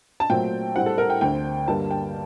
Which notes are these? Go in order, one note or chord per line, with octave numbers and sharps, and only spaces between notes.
A5
A#2 F#3 A3 C4 G5
A2 G3 C4 F#5
A4
A#4
G5
D2 D3 A3 C4 G5
G2 D3 G3 A#3 A5
G5